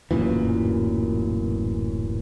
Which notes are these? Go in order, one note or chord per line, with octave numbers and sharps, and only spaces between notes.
D1 F#2 A#2 E3